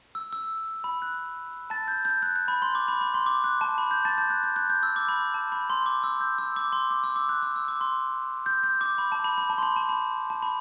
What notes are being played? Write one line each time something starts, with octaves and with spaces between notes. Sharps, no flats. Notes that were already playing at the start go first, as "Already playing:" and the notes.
E6
E6
B5
F#6
A5 A6
G6
G6
F#6
F#6
B5
C6
D6
B5
B5
C6
D6
F#6
A5
B5
G6
A5 A6
G6
F#6
G6
F#6
G6
E6
D6
B5
A5
B5
C6
D6
E6
G6
E6
D6
C6
D6
E6
D6
F#6
E6
E6
D6
C6
G6
G6
D6
B5
A5
B5
B5
A5
C6
B5
A5
B5
A5
B5